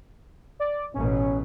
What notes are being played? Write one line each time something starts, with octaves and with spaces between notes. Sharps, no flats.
D5
A1 B2 C#4